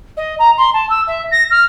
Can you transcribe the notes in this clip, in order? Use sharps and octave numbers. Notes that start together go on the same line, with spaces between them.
D#5
A#5
C6
A5
E6
E5
A#6
F6